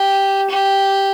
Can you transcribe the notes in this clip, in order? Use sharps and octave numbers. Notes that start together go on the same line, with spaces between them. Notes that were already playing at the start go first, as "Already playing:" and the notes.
Already playing: G4
G4